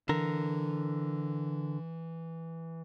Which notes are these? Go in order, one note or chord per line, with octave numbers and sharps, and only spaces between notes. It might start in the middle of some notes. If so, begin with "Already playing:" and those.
D3 E3 A#4